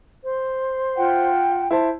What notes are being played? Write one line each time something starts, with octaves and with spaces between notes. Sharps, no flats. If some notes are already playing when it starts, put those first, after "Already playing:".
C5
F4 F#5 G5
E4 C5 A5